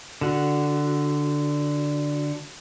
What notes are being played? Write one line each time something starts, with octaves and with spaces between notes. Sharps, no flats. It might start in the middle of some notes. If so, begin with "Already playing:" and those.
D3 F#4